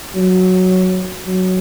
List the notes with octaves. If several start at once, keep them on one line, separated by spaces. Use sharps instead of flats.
F#3
F#3